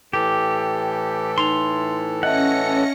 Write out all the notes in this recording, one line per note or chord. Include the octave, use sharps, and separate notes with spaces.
A2 E3 G4 A4
D#4 C6 F7
C#4 D#5 E5 F#5 A5 A#6 C#7